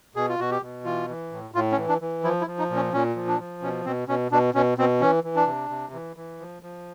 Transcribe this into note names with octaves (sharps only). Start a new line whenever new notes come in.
B2 G#4
F4
B2 F#4
G4
B2
E3 F4
E3
A2
A2 F4
C#4
E3
D4
E3
F3 E4
E4
F3
D#4
A#2
C#4
A#2 C#4
F3
D4
F3
B2 C#4
B2 C4
B2 C#4
B2 D4
B2 C#4
B2 C4
E3 C#4
E3
D4
C3
C3
E3
E3
F3
F3